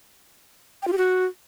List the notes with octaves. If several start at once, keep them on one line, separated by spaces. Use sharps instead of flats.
G5
F4
G4
F#4